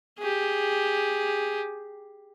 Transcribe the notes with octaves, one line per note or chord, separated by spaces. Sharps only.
G4 G#4